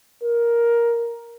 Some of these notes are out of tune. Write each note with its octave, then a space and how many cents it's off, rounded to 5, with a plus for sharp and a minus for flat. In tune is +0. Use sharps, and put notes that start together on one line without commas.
A#4 +10